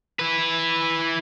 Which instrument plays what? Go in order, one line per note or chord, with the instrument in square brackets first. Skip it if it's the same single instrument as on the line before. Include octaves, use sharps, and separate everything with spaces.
[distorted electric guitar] E4 B4